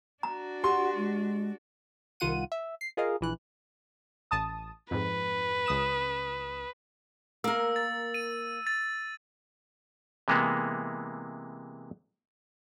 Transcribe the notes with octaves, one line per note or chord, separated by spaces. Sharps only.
D4 F#4 A#5
G4 F#5 C6
G#3
C2 D#3 F4 F#5 D#7
E5
C7
F4 G#4 A#4 D#5 F5
A#1 E3 F#6
A1 A5 D#6
F2 G#2 B4
C#2 D#6 E7
A#3 A#4 E6
A6
D#7
A6
C3 E3 G#3 A#3 B3